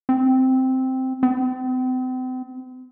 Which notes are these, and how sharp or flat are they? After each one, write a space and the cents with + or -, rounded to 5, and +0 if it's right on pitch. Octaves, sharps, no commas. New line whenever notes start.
C4 -5
C4 -40